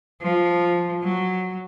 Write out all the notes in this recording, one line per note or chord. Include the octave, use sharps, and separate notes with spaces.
F3
F#3